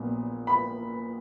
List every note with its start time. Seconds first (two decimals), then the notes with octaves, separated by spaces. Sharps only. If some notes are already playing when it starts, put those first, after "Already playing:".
Already playing: A#1 A#2 F#3 B3
0.47 B5